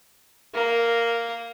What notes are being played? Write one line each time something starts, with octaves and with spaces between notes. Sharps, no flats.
A#3 A#4